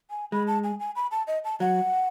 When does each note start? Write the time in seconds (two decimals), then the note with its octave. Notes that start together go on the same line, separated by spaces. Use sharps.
0.10 G#5
0.32 G#3 B5
0.47 A5
0.64 G#5
0.80 G#5
0.96 B5
1.11 A5
1.27 D#5
1.44 A5
1.60 F#3 F#5